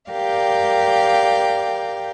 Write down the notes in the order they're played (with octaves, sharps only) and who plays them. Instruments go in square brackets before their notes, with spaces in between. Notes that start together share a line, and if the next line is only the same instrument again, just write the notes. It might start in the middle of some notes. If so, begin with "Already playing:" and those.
[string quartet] G4 A#4 D5 F5 G5